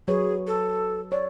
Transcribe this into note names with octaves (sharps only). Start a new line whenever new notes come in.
F#3 G#4 B4 C#5
A4
C#5 D5